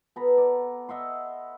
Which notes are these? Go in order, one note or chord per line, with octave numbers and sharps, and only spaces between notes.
B3 A4 A#5 B5
D5
D#5 E5 F#5 C6